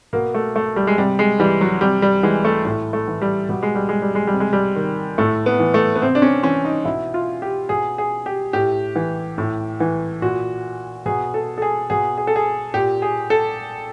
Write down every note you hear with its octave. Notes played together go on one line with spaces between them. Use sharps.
B2 A#3
A3
A3
G3
G#3
C3 G3
G#3
E3 G3
F#3
C3 G3
G3
E3 G#3
A3
A2 A3
A3
E3
G3
B2 G3
G#3
G3
G#3
G3
G#3
G3
C3
G#3
G3
D#3
A2 A3
B3
E3
A3
B3
C3 C4
D4
C#4
E3 C#4
D#4
B2 E4
F4
G4
B2 G#4
G#4
G4
A2 G4
E3
A2
E3
A#2 F#4
B2 G#4
A4
A4
G#4
B2 G#4
G#4
A4
G#4
A#2 G4
G#4
A4